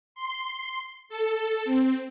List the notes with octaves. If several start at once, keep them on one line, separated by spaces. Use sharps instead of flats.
C6
A4
C4